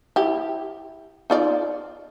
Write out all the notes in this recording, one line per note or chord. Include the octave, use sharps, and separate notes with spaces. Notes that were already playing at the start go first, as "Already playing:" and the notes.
E4 G4
D#4 F4 D5